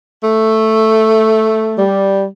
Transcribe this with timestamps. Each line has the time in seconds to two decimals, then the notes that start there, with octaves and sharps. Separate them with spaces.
0.22 A3
1.77 G3